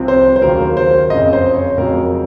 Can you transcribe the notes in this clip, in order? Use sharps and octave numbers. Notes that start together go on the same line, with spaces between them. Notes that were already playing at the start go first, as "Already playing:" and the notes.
Already playing: C2 C3 F3 C4
C5
C5
D#2 C#3 F#3 A#4
C5
F#1 F2 C#3 D#5
C5
C#5
F2 C#3 F#3 A#4